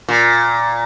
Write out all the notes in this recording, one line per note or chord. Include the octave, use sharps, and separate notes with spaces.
A#2